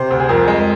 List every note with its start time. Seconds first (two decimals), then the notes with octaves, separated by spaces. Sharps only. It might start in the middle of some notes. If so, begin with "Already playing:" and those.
Already playing: C3 C5
0.11 D2
0.20 G#4
0.29 F2 A#4
0.47 G#3